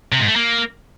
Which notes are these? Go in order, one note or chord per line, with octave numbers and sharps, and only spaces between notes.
C3
G#2
A3
A#3